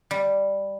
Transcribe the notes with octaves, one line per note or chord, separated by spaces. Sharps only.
G3